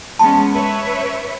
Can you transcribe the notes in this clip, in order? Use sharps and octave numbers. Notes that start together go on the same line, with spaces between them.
G#3 B3 C#4 A5 C6
B4 C#5 E5